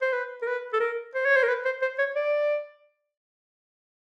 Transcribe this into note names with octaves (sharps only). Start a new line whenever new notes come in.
C5
B4
A#4
B4
A4
A#4
C5
C#5
C5
A#4
B4
C5
C5
C#5
D5